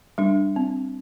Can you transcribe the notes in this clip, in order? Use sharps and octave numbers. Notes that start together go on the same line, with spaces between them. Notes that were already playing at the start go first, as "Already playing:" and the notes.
G3 D4
C4